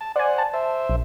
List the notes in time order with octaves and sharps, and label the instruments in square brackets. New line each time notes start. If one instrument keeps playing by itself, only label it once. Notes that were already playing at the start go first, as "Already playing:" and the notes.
[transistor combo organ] A5
[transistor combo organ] C5 F#5 [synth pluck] D5 G#5
[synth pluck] A5
[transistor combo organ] C5 E5
[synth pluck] A#1